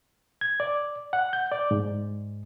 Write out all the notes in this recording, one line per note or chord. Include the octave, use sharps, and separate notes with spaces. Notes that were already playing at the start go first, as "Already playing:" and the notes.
G#6
D5
F#5
G6
D5
G#2